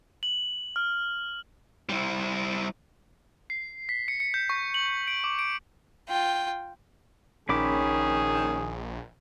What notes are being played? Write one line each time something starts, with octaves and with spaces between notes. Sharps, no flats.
F#7
F6
G3 E4
C7
B6
C#7
C#7
G6
C#6
F#7
D7
D6
D7
F4 G5
A#1 D#3 C#4 G#4 B5 D6